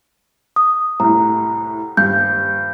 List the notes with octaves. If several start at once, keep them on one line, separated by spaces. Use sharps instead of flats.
D#6
C2 A2 A#5
D#1 G2 G6